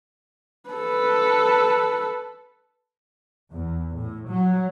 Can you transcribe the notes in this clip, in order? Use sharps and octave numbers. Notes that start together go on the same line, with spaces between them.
A4 B4
E2
A2
F#3